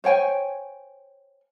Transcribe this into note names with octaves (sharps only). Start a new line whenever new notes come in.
C5 C#5 G5 G#5